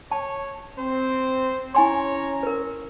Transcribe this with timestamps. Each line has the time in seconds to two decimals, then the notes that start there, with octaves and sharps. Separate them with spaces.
0.12 C#5 A5
0.78 C4 C5
1.75 C#4 E4 C#5 G#5 A#5 C6
2.43 A#4 B4